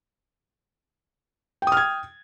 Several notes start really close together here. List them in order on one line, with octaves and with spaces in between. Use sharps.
G5 D#6 F6 G#6